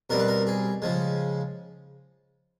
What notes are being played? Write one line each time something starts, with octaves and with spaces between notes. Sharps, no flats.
B2 G3 C4 A#4
B4
A#4
G#4
C#3 F3 G#3